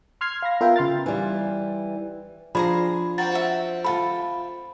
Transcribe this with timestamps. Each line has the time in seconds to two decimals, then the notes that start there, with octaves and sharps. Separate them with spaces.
0.21 C6 F6 G#6 C7
0.42 F5 B5 A#6
0.61 B3 F4 A#4 B4 E5 G5
0.76 C#3 C6 F6 A6
1.06 E3 G3
2.55 F3 D4 G#4 C5 A#5 B5
3.18 C4 F#4 A#4 G5 A6
3.32 F#4 E5
3.84 F4 F#4 A4 B5